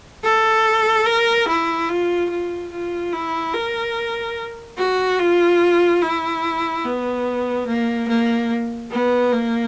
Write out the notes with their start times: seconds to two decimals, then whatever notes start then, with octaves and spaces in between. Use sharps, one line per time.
0.24 A4
1.06 A#4
1.48 E4
1.89 F4
2.30 F4
2.71 F4
3.13 E4
3.54 A#4
4.78 F#4
5.19 F4
6.02 E4
6.84 B3
7.67 A#3
8.08 A#3
8.91 B3
9.32 A#3